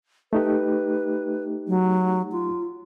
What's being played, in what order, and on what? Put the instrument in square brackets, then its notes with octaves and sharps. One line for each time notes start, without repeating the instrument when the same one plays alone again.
[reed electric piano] A3 D#4 G4 [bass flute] B4
[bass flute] F#3
F4